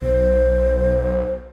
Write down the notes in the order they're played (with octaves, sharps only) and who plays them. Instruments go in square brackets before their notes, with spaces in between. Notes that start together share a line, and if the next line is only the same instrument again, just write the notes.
[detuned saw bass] B1 [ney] C5